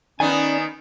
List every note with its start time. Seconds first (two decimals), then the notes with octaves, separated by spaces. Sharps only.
0.20 D#3 B3 C#4 D5 G#5